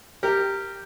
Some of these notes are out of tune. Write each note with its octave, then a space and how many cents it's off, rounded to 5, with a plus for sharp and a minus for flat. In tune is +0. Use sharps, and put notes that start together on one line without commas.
G4 +0 A#4 -15